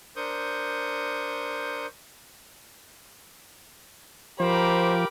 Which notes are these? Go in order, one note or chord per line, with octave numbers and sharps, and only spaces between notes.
D4 A#4 C5 C#6 D#6 G6
F3 G4 A#4 C5 B5 D6